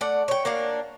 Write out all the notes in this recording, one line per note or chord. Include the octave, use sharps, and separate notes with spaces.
A3 D5 F#5
C#5 G5
A#3 D4 F#4 F5